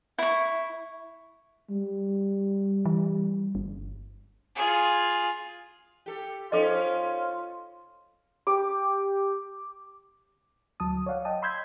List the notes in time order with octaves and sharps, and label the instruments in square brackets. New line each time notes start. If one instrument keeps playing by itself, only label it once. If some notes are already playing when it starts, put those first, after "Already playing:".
[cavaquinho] E4 C#6 [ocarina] E5
[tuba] G3
[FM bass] E3
G1
[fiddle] F4 G#4
[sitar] G4 A4
[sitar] F3 C#4 D#4 [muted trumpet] F4 [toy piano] A4 D#5
[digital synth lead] G4 [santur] D6
[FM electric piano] D2 F#3 A5 D#6
C#5 D5 F5 F#5
D#5 F#5 G5 A5 D#6
B5 C6 E6 G6 G#6 B6